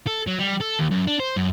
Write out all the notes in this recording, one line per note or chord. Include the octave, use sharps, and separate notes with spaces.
A4
F#3
G3
A4
D#2
F#2
D4
C5
F#2